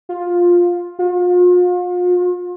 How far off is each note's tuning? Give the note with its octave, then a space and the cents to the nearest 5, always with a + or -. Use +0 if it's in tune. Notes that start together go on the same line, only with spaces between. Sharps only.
F4 +10
F4 +40